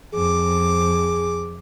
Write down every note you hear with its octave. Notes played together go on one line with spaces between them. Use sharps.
F2 G#4 D6